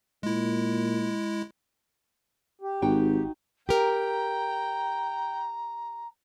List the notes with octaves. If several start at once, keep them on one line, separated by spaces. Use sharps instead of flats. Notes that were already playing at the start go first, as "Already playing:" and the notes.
A#2 G#3 E4
G4
G#1 D#4 F#4 G5
G4 A#4 G5 A#5